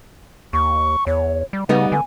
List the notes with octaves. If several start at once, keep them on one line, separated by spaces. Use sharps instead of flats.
D#2 C#6
E2 C#5
G3
C#3 G3 B3 D#4 F#5
D3 G#5